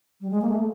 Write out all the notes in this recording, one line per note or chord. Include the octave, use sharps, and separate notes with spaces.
G3
G#3
A#3
A3